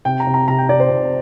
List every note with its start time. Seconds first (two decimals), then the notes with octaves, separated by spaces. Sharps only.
0.05 C3 G5
0.20 A#5
0.27 C3
0.34 A#5
0.48 C3 A#5
0.58 G5
0.69 C3 D5
0.80 C5
0.90 C3